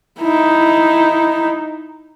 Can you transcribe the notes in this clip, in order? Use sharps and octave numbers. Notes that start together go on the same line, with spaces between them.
D#4 E4